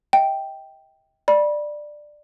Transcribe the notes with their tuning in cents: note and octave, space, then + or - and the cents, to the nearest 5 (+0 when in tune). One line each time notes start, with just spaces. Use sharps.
D#5 +45 G5 +0
D5 +15 B5 -25